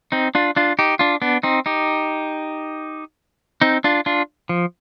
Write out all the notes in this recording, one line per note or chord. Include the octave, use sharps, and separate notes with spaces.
C4 D#4
D4 F4
D4 F4
D#4 G4
D4 F4
B3 D4
C4 D#4
D#4 G4
C4 D#4
D4 F4
D4 F4
F3